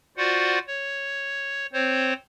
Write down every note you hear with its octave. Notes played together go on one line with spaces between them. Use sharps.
F4 F#4 C5 D5 F#5
C#5
C4 C5 C#5